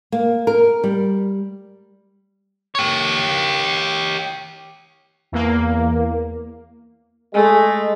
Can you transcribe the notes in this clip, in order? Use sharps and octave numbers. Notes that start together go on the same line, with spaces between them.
A#3
A#4
G3
G4 C#5
E2 A#3
G#3 A3